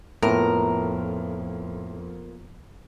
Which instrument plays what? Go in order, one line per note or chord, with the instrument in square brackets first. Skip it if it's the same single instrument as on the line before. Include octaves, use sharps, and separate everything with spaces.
[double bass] F2 [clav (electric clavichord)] A2 [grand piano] A#3 B3 F4 [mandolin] A#4